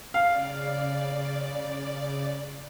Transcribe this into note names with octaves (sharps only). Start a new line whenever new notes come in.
C#3 D5 F5